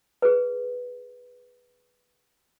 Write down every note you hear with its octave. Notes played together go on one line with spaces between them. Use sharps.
G#4 B4